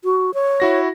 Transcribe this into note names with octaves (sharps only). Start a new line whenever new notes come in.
F#4
C#5
E4 F#4 A#6